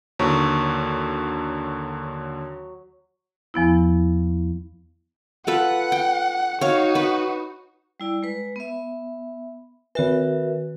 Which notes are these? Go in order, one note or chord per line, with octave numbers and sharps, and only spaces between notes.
D#2 D3 F#3 C#6
E2 F3 B3 E4
F4 A4 B4 F#5
G5
D#4 F#4 C#5 F5
B4
G3 E4 D5
G#3 B4
B3 E5
D#3 F#4 A#4 B4 E5